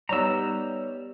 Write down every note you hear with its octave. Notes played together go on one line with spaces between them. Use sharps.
G3 B3 D#4 C#5 D5 A#5 E6